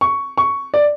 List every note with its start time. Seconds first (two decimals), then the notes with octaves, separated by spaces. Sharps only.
0.01 C#6
0.38 C#6
0.74 D5